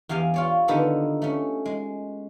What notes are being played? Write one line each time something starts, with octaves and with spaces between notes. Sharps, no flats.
E2 G4 F5 G#5
F4 C#5 D5
D3 D#3 B3 D#4 G4 A4
A3 C#4
G#3